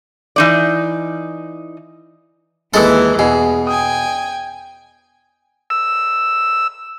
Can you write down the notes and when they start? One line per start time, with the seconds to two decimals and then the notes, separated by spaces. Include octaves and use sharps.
0.36 E3 D#4 D5
2.74 D#2 E3 G#3 E4 A4
3.19 E2 B2 G#4
3.67 G5 G#5 D#6
5.70 E6